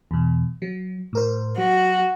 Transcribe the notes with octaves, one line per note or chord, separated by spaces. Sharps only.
E2 B2
F#3
A2 A#4 C5
F#3 F#4